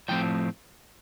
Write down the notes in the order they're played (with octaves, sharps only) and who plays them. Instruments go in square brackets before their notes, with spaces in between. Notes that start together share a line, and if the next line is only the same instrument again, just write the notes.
[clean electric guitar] A2 F3 A3 C4 G5